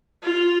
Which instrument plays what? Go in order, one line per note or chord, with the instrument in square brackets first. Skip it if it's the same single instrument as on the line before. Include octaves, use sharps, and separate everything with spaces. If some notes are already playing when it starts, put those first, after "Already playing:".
[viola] F4